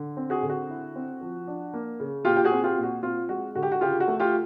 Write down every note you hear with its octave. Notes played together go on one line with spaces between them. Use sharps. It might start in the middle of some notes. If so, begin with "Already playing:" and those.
Already playing: D3
C4
F#4 G#4
D3
F#4
E4
C4
F3
D4
A#3
C#3
A#2 F4 G4
G4
F#4 G#4
C4
F4 G4
A#2
F#4
C4 F4
G#3 F#4
D3 F#4
G4
F#4
C#3 F4 G4
F#4
A3
F4 G4